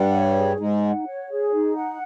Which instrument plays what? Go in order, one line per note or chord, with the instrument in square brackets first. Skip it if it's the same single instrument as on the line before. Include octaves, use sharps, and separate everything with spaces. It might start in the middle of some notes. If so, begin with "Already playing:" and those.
Already playing: [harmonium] G2 G3 [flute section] F#5
[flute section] C#5
G#4
[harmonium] G#2 G#3 [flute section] D#4
[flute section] F#5
C#5
G#4
D#4
F#5